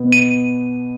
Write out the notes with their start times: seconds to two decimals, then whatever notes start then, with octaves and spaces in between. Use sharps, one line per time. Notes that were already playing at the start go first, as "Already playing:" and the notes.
Already playing: B2 B3
0.12 D#7